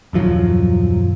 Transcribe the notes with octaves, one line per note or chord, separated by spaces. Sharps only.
D#1 F#2 F3 F#3